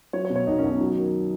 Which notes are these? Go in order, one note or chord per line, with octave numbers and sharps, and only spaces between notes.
F#3 C#5
C#5
B2
C#5
B1 D#4
B1 C#4
D#4
F#3
D#3